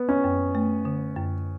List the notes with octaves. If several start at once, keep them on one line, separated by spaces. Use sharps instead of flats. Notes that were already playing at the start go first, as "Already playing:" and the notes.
Already playing: B3
C#4
F#2
A3
D3
F#2